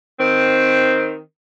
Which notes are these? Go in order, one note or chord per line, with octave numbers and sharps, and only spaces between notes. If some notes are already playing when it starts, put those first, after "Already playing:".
D#3 C4